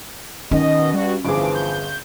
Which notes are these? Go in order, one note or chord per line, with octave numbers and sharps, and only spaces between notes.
B2 D#3 C#4 D#5
G2 G3 F#4
G1 E3 F3 G#4 D6
G6